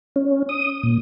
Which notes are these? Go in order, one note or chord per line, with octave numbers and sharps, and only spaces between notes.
C#4
D#6
A#2